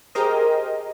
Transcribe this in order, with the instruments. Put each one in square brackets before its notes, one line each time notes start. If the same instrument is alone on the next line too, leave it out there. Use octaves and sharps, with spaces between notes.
[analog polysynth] G4 G#4 A#4 C5 D#5